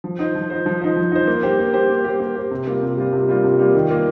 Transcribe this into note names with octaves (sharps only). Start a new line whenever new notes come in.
F3
D#4 C5
F3
D#4 C5
F3
D#4 C5
F3
D#4 C5
A#3
G4 C5
A#3
G4 C5
A#3
G4 C5
A#3
G4 C5
C3
G3 A#3 F4
C3
G3 A#3 F4
C3
G3 A#3 F4
C3
G3 A#3 F4
D#3
A#3 F4